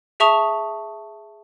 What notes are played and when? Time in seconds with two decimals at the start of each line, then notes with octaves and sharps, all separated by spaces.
0.20 G#4 E5 A5 C#6 D#6 F7